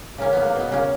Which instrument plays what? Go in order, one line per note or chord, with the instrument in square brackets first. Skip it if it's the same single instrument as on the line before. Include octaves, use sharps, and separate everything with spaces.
[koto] C#3 A#3 C#4
A#3 B3
A#3
B2 B3
C#3 A#3 C#4